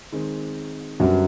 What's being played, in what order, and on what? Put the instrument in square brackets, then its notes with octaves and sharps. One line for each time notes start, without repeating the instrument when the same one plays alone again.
[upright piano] D#3 G#3 C4
[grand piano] F#2 F#3 [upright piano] D3 G3 B3